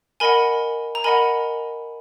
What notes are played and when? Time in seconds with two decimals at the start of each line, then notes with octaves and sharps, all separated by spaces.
0.20 A#4 D#5 F#5 G#5 B5
0.95 A#5
1.04 A#4 D#5 F#5 G#5 B5